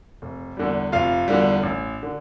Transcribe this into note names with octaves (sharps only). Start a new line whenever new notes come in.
F1
E2 D3 G3
F1 F4 F5
E2 D3 G3
A1
D3